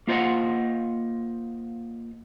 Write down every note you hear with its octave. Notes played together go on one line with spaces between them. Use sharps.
A#3 F4 C5 D#5 F#5